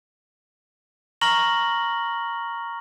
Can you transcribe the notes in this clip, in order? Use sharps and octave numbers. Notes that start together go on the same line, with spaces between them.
A#5 C#6 F6 A#6 F#7 G7